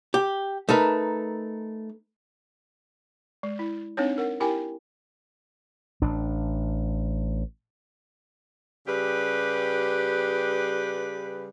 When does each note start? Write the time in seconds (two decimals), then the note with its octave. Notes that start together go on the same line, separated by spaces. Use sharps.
0.14 G4
0.69 A3 D#4 A#4 B4
3.43 G#3
3.59 E4
3.97 C4 D4 D#4 C#5
4.18 A#4 F#5
4.40 E4 G4 A#4 G5 G#5
6.02 A1 D4
8.86 C#3 G3 G4 B4